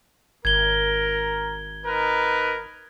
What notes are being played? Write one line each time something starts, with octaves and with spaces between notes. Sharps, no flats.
G#1 A#4 G#6 G7
D#4 A#4 B4